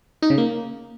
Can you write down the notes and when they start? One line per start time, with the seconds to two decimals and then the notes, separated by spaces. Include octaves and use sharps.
0.22 D#4
0.30 C#3
0.38 A#3